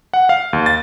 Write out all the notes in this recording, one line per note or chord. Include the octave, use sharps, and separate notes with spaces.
F#5
F5
D#2
A6